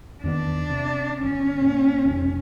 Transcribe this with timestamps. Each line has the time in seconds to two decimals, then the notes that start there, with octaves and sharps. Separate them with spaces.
0.24 E2 D#3 B3 D4
0.70 C3
1.23 G1 C#4
1.61 A#2
2.05 F1 B1